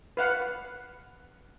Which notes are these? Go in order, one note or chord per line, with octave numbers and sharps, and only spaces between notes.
B4 F5 F#5